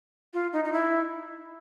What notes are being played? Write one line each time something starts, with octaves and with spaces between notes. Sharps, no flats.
F4
D#4
D#4
E4